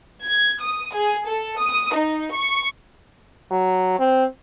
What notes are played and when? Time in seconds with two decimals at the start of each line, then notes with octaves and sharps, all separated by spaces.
0.23 G#6
0.60 D#6
0.94 G#4
1.26 A4
1.58 D#6
1.94 D#4
2.31 C#6
3.51 F#3
3.99 C4